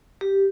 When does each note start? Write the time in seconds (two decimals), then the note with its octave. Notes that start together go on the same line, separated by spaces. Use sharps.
0.21 G4